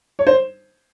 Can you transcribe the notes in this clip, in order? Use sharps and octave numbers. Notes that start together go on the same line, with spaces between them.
C#5
C5